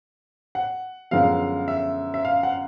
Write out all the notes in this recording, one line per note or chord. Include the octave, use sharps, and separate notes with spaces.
F#5
F#2 D3 F3 G#3 B3 F5
E5
E5
F5
F#5